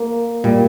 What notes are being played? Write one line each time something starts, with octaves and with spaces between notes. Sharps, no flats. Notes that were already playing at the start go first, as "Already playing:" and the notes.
Already playing: A#3
A#2 G3